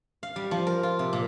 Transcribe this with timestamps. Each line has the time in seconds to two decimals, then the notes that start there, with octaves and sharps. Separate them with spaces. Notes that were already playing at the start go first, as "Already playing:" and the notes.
0.23 F5
0.36 G3
0.51 F3
0.67 A#4
0.83 F4
0.99 C3
1.13 A#2